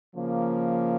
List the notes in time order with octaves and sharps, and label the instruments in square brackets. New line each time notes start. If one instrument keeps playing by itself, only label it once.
[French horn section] C#3 F3 A#3